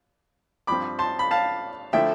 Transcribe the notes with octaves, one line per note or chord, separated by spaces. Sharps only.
G2 F3 C4 B5 D6
A5 C6
B5
F5 A5
D3 F3 A3 E4 E5 G5